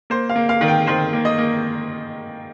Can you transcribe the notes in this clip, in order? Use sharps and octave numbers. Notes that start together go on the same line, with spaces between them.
A#3 C5
F5
A#3
F5
D#3
G5
D#3 C5
A#3
D#5
A#3